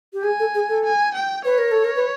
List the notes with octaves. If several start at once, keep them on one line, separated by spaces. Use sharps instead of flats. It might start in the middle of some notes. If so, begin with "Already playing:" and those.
G4
G#4 G#5
A4
G#4
A4
G#5
G5
B4 C#5
A#4
A4
A#4
B4